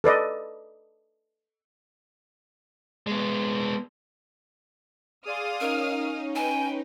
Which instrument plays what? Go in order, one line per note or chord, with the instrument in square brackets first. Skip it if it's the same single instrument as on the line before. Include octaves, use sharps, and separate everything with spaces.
[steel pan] A4 B4 D5 D#5
[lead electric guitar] G#3 B3
[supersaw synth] G#4 D5 C6 [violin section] F5 D#6 F6
[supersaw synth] C#4 D#4 [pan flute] A#4
[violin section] B4 G5 [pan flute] G#5